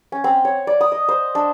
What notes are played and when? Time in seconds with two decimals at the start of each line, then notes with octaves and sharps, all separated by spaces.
0.12 C#4
0.24 C4
0.45 C#5
0.67 D5
0.81 D#6
0.92 D#5
1.09 C5
1.35 D4